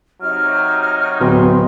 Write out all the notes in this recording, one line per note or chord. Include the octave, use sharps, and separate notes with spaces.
C3 F#3 D#4 F6
D1 B2 C6